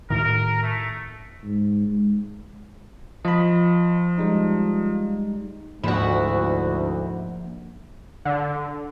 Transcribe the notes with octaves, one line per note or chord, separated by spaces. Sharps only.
A2 D#3 A#4
A3
G#2
G#3
F3 D#5 B5
G3 G#3 D#4
D2 G#2 F3 A#3 D4 E4 F#4
D3